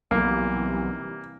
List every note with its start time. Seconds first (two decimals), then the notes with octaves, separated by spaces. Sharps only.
0.11 B1 C3 E3 G3 A#3